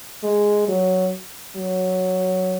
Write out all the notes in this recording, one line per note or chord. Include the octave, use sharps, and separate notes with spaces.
G#3
F#3
F#3